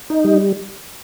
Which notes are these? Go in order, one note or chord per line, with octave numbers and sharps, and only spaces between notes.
D#4
G3